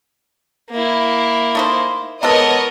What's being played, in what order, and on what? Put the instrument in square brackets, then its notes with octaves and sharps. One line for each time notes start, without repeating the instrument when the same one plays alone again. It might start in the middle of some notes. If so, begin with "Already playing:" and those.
[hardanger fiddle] A#3 E4
[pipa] A3 D#4 C5
[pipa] E3 G#3 A4 [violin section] B3 C#5 D#5 [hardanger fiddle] A#4